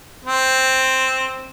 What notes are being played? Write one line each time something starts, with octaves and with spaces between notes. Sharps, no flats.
C4